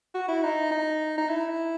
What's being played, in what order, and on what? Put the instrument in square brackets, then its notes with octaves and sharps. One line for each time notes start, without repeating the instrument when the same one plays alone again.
[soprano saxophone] F#4
E4
D#4
D#4
D#4
E4